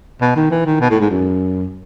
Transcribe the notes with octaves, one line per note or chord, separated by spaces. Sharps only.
B2
D#3
E3
D#3
B2
A2
G#2
F#2